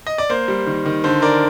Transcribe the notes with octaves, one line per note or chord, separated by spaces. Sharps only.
D#5
D5
A#3 C5
G3
D#3
D#3
D3 C5
D3 A#4 D5